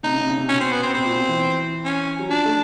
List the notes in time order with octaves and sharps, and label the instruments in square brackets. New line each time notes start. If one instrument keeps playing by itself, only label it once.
[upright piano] C3 [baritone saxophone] D#4
[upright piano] C#3
C3
C#3
C3
[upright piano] B2 [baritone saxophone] C#4
[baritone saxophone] C4
B3
C4
[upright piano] B2 [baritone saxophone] C4
[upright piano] A#2
B2
E3
[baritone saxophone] C#4
[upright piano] F#3
[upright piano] F3 [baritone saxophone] D4
[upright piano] A3